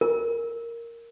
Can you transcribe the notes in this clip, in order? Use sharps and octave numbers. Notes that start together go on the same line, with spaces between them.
A#4